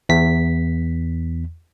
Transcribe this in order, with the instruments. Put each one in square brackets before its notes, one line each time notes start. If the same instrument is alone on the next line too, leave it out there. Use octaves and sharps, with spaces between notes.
[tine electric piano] E2 B6